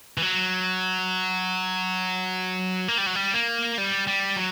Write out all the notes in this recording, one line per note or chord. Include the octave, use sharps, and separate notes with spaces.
E3
F#3
A#3
G3
F#3
G3
A#3
G3
G3
F#3